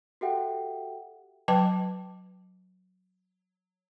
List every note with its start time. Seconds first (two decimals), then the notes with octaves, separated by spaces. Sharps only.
0.21 F#4 G4 A4 E5 F#5 G5
1.48 F#3 B4 G5 A5 D6